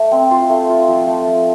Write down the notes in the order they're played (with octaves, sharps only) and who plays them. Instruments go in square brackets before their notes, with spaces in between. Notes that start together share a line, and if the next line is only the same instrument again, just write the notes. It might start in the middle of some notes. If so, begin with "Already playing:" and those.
Already playing: [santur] A3
C4
F4 C6
A3
F4
F3
A3
F3